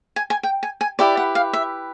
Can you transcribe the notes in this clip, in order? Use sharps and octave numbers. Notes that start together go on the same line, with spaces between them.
G#5
G#5
G5
G#5
G#5
E4 G4 B4 D5
F#5
F5
E5